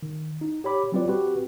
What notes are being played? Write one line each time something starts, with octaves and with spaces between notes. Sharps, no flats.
D#3
D#4
G4 C#5 B5 D6
F#3 G3 C4 F4 B4 D5
C4 F#4 G4 B4